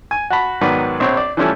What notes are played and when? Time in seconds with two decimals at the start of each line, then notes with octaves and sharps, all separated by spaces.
0.11 G#5
0.30 F#4 A5 B5
0.61 G#2 D#3 F#3 B3 B4 D5
1.00 A#1 C4 C#5
1.17 D5
1.37 E3 F3 G3 A3 C#4 E4